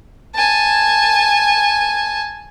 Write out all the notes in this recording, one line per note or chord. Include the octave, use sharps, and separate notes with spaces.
G#5 A5